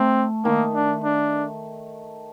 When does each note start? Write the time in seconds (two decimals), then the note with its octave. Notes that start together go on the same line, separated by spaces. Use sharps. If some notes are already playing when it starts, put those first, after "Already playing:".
Already playing: A3 C4
0.44 D#3 A#3
0.75 D4
1.04 D4